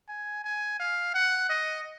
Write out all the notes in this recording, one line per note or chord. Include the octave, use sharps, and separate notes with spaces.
G#5
G#5
F5
F#5
D#5